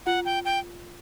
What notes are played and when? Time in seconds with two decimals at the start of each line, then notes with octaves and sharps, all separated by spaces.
0.06 F4 F#5
0.25 G5
0.45 G5